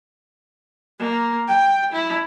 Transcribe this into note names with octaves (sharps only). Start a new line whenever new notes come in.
A#3
G5
E4